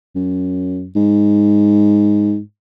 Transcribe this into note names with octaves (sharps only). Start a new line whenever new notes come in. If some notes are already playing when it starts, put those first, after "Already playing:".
F#2
G#2